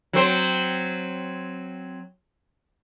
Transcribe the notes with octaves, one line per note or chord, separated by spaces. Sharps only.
F#3 C4 C5